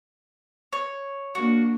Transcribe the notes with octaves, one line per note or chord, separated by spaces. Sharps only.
C#5
A#3 D4 F#4